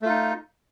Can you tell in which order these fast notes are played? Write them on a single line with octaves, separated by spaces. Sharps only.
A3 F4 D#4